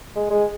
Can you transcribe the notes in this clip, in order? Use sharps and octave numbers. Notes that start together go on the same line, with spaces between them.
G#3
G#3